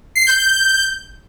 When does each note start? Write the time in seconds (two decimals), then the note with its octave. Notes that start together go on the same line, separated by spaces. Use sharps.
0.16 C7
0.27 G6
0.38 G6